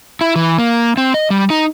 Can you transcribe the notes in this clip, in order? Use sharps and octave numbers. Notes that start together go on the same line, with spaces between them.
E4
E3
A#3
C4
D#5
G3
D#4